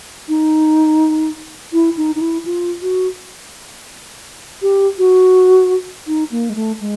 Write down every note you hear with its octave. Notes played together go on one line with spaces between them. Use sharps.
D#4
E4
D#4
D#4
E4
F4
F#4
G4
F#4
D#4
A#3
G#3
A3
G#3